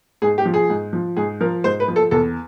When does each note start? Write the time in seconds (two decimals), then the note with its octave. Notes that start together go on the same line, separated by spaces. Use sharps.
0.22 G#2 G#4
0.38 G4
0.45 F3
0.54 G#4
0.70 G#2
0.93 F3
1.17 G#2 G#4
1.41 F3 A#4
1.64 G#2 C5
1.80 B4
1.88 F3
1.96 A4
2.11 E2 A4